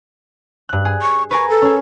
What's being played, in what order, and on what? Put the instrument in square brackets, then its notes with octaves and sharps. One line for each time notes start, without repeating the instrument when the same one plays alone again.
[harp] G2 F#6
G#4
[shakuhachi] C#6
[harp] G#4 A#4 B4 [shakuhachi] C#6
[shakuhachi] A4
[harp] C#4 G#4